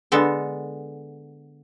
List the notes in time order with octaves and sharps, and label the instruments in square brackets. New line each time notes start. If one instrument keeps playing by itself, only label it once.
[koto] D3 G#3 B3 A4